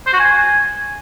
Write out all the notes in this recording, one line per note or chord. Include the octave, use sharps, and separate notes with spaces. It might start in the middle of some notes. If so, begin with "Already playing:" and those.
C5
F#4
G#5